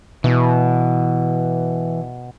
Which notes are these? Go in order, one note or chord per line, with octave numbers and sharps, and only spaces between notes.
B2 E3